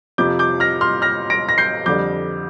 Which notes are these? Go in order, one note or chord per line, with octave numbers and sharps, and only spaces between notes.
F2 C3 F3 D6 G6
D6 G6
F6 A#6
C6 F6
F6 A#6
A#6 D7
A#6
G6 C7
F2 D3 G3 D6 G6